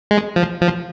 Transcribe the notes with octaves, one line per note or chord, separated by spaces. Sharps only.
G#3
F3
F3